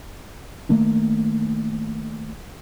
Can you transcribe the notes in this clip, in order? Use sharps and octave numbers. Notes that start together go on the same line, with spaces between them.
D#3 A3 A#3 D4